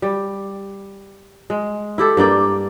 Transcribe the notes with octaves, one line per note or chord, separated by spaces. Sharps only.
G3
G#3
E4 G4 A4
G2 A#3 D5 G5